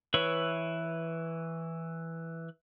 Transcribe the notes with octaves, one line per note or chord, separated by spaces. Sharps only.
E3 B4 C#5 E5